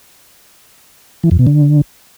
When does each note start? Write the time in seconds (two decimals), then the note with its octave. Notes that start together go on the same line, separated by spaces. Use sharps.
1.23 E3
1.31 F2
1.39 B2
1.47 D3